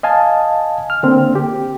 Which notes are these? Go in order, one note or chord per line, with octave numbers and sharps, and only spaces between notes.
D#5 F5 G#5 A5
F6
D3 A#3 C4
G4